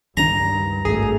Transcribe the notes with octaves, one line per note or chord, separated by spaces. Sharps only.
C#2 G2 D#3 D4 A#5
G#1 A3 G#4